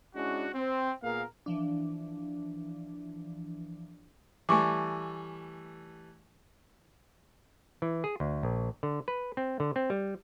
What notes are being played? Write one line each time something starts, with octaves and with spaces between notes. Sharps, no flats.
G#3 C#4 D4 E4 F#4
C4
A#2 A#3 B3 G#4 A#4 F5
E3 F3 D4
E3 G3 A3 G#5 C#6 D6
E3
G#4
D2
A#1
D3
B4
C4
D3
C4
G3